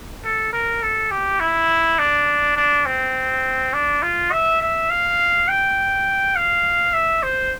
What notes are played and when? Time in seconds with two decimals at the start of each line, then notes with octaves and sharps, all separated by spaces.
0.24 A4
0.53 A#4
0.83 A4
1.11 G4
1.40 E4
1.99 D4
2.57 D4
2.86 C4
3.74 D4
4.03 F4
4.32 E5
4.61 E5
4.90 F5
5.48 G5
6.36 F5
6.94 E5
7.23 C5